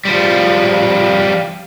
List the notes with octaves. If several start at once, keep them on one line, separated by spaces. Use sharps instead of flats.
F3 G3